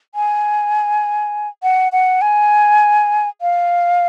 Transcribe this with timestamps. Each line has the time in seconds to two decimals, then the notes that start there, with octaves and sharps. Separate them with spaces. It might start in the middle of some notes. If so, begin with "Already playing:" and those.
0.15 G#5
1.63 F#5
1.92 F#5
2.22 G#5
3.42 F5